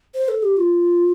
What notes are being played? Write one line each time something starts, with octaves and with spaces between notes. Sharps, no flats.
C5
A4
G4
F4